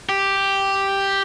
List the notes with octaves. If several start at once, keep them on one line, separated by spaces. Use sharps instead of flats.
G4